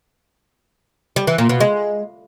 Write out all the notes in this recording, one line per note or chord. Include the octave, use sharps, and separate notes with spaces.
G3
E3
A#2
B2
G#3